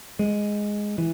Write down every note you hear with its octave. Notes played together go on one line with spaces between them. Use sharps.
G#3
E3